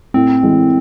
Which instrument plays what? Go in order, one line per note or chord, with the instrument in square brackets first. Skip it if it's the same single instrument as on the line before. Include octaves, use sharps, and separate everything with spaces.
[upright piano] A2 [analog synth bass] C4
[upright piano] E3 G#3